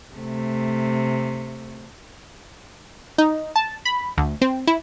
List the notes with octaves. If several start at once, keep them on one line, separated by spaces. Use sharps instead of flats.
C3 A3
D#4
A5
B5
D2
C4
E4